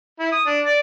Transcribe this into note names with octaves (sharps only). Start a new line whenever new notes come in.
E4
D#6
D4
D5